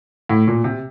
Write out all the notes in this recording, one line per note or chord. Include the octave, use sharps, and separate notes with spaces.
A2
A#2
C3